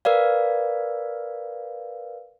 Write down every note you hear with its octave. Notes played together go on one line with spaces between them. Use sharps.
A#4 B4 D5 F5